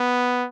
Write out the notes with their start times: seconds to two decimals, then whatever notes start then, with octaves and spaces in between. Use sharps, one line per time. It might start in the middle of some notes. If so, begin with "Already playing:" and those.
Already playing: B3